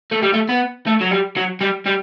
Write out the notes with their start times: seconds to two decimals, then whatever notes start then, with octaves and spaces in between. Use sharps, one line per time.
0.11 A3
0.22 G3
0.33 A3
0.49 B3
0.87 A3
1.01 F#3
1.11 G3
1.36 F#3
1.61 G3
1.86 G3